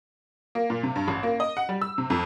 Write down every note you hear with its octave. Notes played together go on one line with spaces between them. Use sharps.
A#3
A#2
C3
G2
A1
A#3
D#5
F#5
G3
E6
C3
F2